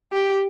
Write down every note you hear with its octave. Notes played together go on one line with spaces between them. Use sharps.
G4